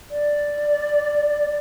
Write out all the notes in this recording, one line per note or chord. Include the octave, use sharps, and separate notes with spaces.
D5